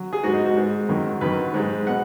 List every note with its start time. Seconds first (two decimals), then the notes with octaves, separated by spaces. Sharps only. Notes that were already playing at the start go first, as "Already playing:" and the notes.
Already playing: F#3
0.13 G#4
0.24 G#2 G#3 F#4
0.34 D#4
0.45 F#4
0.55 G#2 G#3
0.89 F#2 D#3 F#3
1.21 F#2 D#3 F#3 B4
1.54 G#2 G#3
1.87 B2 F#5